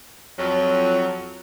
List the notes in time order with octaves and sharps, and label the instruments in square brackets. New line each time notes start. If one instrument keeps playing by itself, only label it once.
[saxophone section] F2 F#3